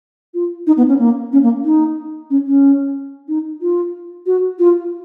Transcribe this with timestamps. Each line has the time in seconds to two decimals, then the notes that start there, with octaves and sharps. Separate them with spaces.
0.34 F4
0.67 D#4
0.77 B3
0.89 C#4
0.99 A#3
1.33 C#4
1.43 A#3
1.64 D#4
2.30 C#4
2.47 C#4
3.28 D#4
3.62 F4
4.26 F#4
4.59 F4